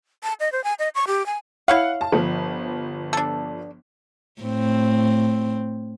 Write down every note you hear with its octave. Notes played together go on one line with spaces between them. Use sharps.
A5
D#5
C5
G#5
D#5
C#6
G4
G#5
E4 C#5 F5 F#5
A5
G1 F3
D4 A4
A2 C4